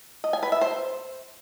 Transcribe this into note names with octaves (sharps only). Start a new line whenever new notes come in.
D#5
G#5
B4
E5
C5